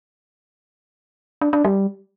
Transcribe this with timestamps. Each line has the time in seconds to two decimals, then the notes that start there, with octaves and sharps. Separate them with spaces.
1.41 D4
1.53 D4
1.65 G3